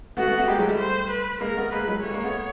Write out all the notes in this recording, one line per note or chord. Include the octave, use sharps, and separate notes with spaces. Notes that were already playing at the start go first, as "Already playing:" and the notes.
A3 B3 F#4
A3 B3
A3 B3
G#3 A#3 G4
F#3 G#3
G3 A3
C5
B4
G#3 A#3 A#4
A3 B3
G#3 A#3 B4
F#3 G#3
G3 A3 C#5
G#3 A#3
A3 B3